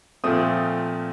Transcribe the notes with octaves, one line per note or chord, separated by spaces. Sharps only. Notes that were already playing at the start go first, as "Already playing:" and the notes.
A#2 F3 A3 C4 D#6